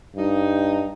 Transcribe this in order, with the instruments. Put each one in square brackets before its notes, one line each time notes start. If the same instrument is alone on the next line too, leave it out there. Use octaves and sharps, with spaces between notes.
[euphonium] G2 [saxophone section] D#4